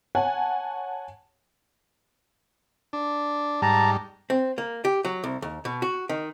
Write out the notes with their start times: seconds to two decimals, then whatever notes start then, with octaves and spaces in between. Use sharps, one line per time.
0.15 C#5 F#5 G#5 A5
2.93 D4
3.62 G#2 G3 A5 A#5
4.30 C4
4.58 A#3
4.85 G4
5.05 F#3
5.24 C2
5.42 D#2
5.65 B2
5.82 F#4
6.09 D#3